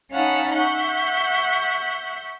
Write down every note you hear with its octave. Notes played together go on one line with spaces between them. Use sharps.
C#4 D#4 F5 F#5 A5 B5
E5 F#5 C#6 G6